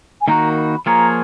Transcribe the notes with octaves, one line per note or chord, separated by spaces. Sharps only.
G#5
D#3 A#3 D#4 F#4 A#5
B5
F3 A#3 F4 G#4 C#5 A#5